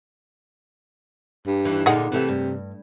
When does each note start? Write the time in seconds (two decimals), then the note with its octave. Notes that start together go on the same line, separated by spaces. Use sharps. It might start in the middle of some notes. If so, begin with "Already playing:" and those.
1.47 G2
1.65 D#2 E3
1.86 A#2 D3 D#4 G#4 F#5
2.12 C3 E3 A3 E5
2.28 G2